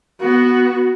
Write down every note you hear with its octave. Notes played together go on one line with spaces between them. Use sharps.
B3 F#4